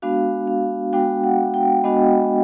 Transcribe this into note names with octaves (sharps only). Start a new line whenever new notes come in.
G#3 B3 D4 F#4 F5
F5
G#3 B3 D4 F#4 G5
F#5
G5
G#3 B3 D4 F#4 D#5